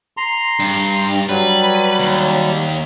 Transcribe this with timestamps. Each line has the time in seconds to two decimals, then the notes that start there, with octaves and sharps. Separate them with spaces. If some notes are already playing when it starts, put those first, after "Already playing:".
0.17 A#5 C6
0.59 G2
1.29 F#3 G3 B4
1.99 D#2